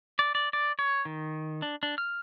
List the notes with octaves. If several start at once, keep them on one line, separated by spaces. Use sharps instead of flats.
D5
D5
D5
C#5
D#3
D4
D4
F6